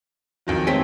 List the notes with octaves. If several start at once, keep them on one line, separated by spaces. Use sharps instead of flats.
F2 D#3 F#3
G#3 A3 C4 C#5 B6